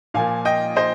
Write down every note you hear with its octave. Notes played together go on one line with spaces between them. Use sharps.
A#2 F3 A#3 F5 G#5
D#5 G5
C5 D#5